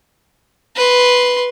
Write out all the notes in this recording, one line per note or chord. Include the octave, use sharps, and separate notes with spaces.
B4 C6